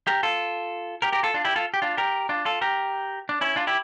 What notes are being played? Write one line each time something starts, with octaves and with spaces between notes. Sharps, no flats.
G4 A#4
F4 A4
G4 A#4
G4 A#4
F4 A4
D4 F4
E4 G4
F4 A4
G4
D4 F4
G4 A#4
D4 F4
F4 A4
G4 A#4
D4
C#4 E4
D4 F4
E4 G4